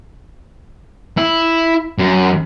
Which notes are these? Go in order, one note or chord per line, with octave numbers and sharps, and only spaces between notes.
E4
F#2